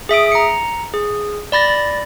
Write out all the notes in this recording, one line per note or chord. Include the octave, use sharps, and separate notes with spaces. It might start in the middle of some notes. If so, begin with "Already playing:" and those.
G#4 E5 D#6 D7
A#5 C#7
G#4
D5 B5 A6 A#6